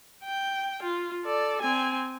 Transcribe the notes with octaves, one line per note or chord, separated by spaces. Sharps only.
G5
F4
A4 D5
C4 G#5